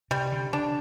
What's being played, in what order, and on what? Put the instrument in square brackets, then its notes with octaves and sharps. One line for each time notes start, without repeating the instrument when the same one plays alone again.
[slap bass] C3 [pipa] G3
[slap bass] D3
[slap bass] D3 [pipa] D4